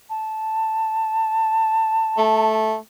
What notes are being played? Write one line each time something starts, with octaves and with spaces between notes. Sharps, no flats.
A5
A3